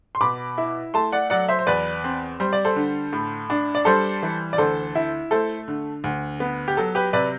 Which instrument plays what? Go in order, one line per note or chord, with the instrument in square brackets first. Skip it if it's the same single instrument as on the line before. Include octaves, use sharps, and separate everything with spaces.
[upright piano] C6
B2 B5 D6
E4
A3 A5 C6
D5 F#5
F#3 D5 F#5
C5 E5
C5
E2 B4 D5
C4
G3 C5
D5
A4 C5
D3
A2
D4
D5
G3 A4 C5
E3
D5
D2 A4 C5
E4
A3 A4 C5
D3
D2
B3
G4
F#3 A4
G4 B4
C3 B4 D5